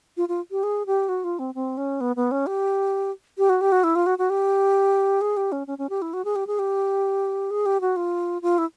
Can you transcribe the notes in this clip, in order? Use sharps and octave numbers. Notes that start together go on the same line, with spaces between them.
F4
F4
G4
G#4
G4
F#4
F4
C4
C4
C#4
B3
B3
C#4
G4
G4
F#4
G4
F#4
E4
F4
F#4
F#4
G4
G#4
G4
C#4
C#4
C#4
G4
E4
F#4
G#4
G4
G#4
G4
G#4
G4
F#4
F4
F4
E4